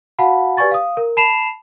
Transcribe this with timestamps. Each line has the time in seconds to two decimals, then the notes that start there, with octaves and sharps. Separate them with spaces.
0.19 F#4 F5 F#5 A5 B5
0.57 G4 B4 D5 G#5 C#6 A6
0.71 F5 D#6
0.97 A#4
1.17 A5 B5 C7 E7 F7